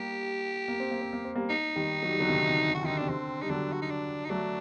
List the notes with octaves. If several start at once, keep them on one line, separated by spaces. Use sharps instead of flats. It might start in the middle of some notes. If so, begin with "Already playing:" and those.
Already playing: G3 A#3 G4
A#3
C4
A#3
C4
A#3
C4
G3 A#3
D#4
D#3 G3
F#3
G3
D3 F#3
C3 D#3
D3
C3
F#4
D#3
D3 D#4
C3 D4
D3 C4
G3 D#4
D3 F#3 D4
F#4
D#4
D4
D#4
F#3 A3 D4